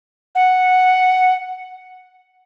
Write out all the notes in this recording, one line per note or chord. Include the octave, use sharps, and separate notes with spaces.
F#5